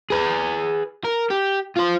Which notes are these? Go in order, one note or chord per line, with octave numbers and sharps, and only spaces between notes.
G#4 B4
A#4
G4
F4 C5